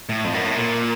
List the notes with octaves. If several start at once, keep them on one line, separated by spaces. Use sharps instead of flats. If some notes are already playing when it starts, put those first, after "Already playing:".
A2
F2
F#2
A2
A#2